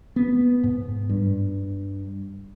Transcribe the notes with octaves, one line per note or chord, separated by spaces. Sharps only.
B3
G#2
G2